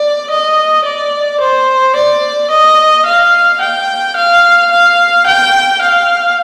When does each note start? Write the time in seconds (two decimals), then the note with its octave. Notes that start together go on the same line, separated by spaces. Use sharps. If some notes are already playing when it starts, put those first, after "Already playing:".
Already playing: D5
0.30 D#5
0.85 D5
1.40 C5
1.95 D5
2.50 D#5
3.05 F5
3.61 G5
4.16 F5
4.71 F5
5.26 G5
5.81 F5